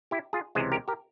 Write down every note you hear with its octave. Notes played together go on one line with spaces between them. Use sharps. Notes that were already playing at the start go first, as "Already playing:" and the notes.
E4 G4
F4 G#4
C#2 C3 E3 G#3 G#4 C5
G4 A#4
G4 A#4